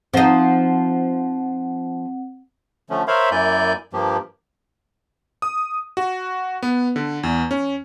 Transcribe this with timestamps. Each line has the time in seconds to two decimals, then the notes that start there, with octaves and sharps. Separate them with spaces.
0.14 F3 C4 D#4 F#5
2.90 D3 F3 A3 C#4
3.08 A#4 C5 C#5 E5 F5 B5
3.31 F#2 A#3 E4 D5 G#5 G6
3.93 G2 F3 A#3 G4
5.42 D#6
5.97 F#4
6.62 B3
6.96 D3
7.23 E2
7.51 C#4